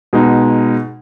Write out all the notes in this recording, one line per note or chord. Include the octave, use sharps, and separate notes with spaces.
B2 G#3 D#4